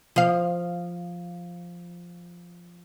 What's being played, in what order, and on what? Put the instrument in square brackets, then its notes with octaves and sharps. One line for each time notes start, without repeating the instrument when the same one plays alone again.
[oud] F3 F5